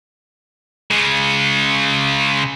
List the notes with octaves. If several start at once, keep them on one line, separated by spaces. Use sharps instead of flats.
C#3 G#3